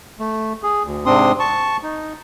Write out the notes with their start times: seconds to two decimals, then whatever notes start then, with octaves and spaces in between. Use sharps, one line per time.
0.19 A3
0.63 G#4
0.84 D2
1.06 G#2 C3 C4 D4 C6 D#6
1.39 A5 C#6
1.83 D#4